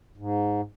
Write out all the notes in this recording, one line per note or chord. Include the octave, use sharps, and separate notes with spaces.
G#2